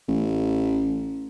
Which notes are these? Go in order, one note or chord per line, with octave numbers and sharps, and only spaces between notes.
A1